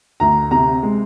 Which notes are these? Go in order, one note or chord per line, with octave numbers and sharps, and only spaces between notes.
D2 A#5
C3 A#5
G#3